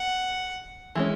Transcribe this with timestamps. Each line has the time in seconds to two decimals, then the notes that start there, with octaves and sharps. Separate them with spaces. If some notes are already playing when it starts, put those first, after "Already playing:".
Already playing: F#5
0.95 E3 G#3 C#4